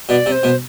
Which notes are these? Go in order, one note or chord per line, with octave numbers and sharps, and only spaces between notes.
B2 D5
C3
C5
B2